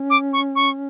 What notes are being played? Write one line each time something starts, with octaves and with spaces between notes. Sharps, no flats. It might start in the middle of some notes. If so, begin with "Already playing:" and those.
Already playing: C#4
D6
C#6
C#6